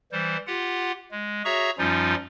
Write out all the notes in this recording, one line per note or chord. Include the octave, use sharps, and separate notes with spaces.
E3 G3 C5
F4 G4 F#5
G#3
F#4 G#4 C#5 E5 A#5 C#6
F#2 F3 G3 C#4 D#4 F4